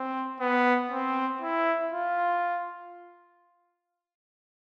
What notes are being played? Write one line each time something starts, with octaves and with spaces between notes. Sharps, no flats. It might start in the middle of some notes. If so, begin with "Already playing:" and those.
Already playing: C4
B3
C4
E4
F4